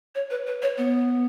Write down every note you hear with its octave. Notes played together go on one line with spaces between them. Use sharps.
C#5
B4
B4
C#5
B3